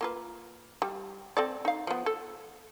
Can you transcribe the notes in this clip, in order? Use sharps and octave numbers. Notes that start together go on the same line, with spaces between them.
A#3 F4 B4
G3
C4 A4 D5
D#4 F5
F3 B3
A4